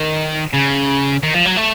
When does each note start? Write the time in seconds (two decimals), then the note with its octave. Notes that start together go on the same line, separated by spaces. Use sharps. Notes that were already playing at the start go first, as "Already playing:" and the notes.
Already playing: D#3
0.53 C#3
1.23 D#3
1.34 F3
1.46 F#3
1.57 A3